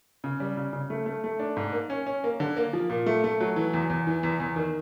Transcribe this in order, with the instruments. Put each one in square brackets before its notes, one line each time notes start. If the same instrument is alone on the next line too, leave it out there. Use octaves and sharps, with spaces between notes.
[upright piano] C#3
G3
C#3
C#3
A3
A3
A3
D4
G#2
A#3
C#4
C#4
A#3
D3
A#3
F3
A#2
A3
A3
F#3
E3
E2
E2
E3
E2
E2
D#3